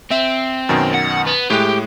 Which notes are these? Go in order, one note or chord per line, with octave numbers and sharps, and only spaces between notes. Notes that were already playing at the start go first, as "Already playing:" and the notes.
C4 E5
F#2 B2 D#3
F#5
B3
A2 G#3 G4 F#6